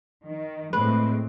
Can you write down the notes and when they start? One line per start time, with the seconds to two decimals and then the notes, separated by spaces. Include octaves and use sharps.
0.24 D#3
0.73 A2 G#3 C4 B4